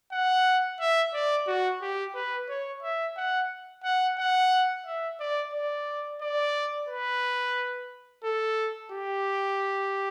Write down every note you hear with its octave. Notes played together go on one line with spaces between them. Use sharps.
F#5
E5
D5
F#4
G4
B4
C#5
E5
F#5
F#5
F#5
E5
D5
D5
D5
B4
A4
G4